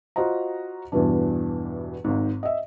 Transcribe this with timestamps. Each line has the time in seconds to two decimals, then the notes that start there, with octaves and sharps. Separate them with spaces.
0.16 F4 F#4 C5 D#5 A#5
0.92 E2 G2 B2 E3 D4
2.04 G#1 G#2
2.43 D#5 E5